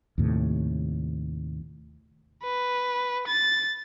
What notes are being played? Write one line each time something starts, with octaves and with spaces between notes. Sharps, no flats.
D#2 A2 C3
B4
A6